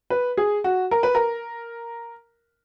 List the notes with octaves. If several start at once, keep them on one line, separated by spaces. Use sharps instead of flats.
B4
G#4
F#4
A#4
B4
A#4